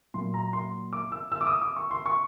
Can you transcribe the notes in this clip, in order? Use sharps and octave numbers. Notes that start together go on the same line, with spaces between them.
A#2 F#3 A#3 C6
A#5
C6
D6
E6
E6
D6
D#6
D6
C#6
C6
C#6